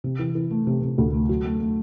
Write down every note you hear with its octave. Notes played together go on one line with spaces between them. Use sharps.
C3
E3
E3
A3
C3
C3
D2
A3
F#3
A3
A3